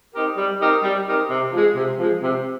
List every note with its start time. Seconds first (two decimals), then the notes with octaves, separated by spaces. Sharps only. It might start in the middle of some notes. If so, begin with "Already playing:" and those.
0.14 C4 D#4 G4 A#4
0.37 G3
0.60 C4 D#4 G4 A#4
0.83 G3
1.07 C4 D#4 G4 A#4
1.30 C3
1.53 F3 G#3
1.75 C3
1.99 F3 G#3
2.22 C3